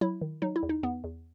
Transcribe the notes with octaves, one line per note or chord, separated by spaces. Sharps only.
F#3 E4
D#3
F#3 D#4
E4
E2
D#4
E2 B3
E2